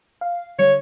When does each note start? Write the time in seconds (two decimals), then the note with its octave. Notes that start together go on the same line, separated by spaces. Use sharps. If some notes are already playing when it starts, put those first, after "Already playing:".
0.21 F5
0.59 D3 G3 C#5